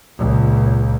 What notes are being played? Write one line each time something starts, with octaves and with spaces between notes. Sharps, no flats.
C#2 A#2